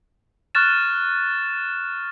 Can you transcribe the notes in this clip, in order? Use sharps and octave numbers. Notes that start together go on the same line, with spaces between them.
C#6 F6 F#6 A6 E7